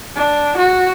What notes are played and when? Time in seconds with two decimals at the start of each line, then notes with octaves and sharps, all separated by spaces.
0.16 D4
0.57 F#4